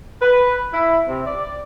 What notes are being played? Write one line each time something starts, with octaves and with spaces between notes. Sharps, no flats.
B4
E4
C3
D5